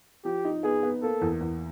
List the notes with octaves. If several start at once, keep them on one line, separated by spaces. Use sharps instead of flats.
F3 G4
D#4
B3 G#4
B3
A#3 A4
E2
E2